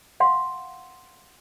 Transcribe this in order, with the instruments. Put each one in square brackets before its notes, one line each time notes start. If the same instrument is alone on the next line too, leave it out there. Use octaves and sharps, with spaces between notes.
[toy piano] F5 F#5 C6